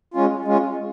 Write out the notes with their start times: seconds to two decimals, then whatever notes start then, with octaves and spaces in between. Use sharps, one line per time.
0.14 G#3 C#4 F4
0.45 G#3 C#4 F4